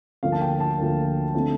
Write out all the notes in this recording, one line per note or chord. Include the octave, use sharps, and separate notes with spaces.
D2 D3 F3 A#3 F5
A5
G5
A5
D2 D3 F3 A#3
D3 A3 C4